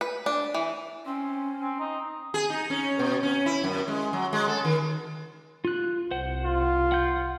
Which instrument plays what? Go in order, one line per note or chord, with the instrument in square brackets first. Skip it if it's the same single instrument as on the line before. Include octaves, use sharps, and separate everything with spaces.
[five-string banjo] B4
D4
E3
[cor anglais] C4 [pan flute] C#4
[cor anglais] C4
D#4
[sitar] G#4
D#4
C#4
B2
C#4
E4
F#2
G#3
F#3
G#3
A4
D#3
[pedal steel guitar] F4 F#6
[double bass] C2 [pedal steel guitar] C5 F#5
[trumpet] F4
[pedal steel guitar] F#5 G6